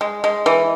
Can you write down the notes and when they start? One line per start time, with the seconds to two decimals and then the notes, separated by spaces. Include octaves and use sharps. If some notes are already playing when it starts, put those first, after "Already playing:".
0.01 G#3
0.24 G#3
0.46 E3